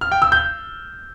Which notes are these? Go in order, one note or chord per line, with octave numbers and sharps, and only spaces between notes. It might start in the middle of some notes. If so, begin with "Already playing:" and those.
F6
G5
E6
G6